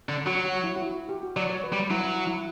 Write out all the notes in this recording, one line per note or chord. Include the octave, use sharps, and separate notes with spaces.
D3
F#3 F#4
F#4
E4
F#4
E4
G4
F#4
F#3 D5
C#5
B4
G3
F#3 E4
E4